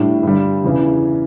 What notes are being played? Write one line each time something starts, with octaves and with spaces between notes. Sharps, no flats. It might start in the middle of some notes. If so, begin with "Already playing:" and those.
Already playing: A2 G3 D4
G2 D3 G3
E2 C#3 E3